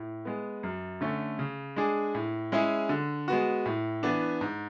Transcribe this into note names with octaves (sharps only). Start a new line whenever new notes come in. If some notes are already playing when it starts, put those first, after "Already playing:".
Already playing: A2
G#3 B3
F#2
D3 A3 C#4
C#3
G#3 D4 G#4
A2
G#3 C#4 E4 G#4
D3
G#3 B3 F#4
A2
E3 B3 D4
G#2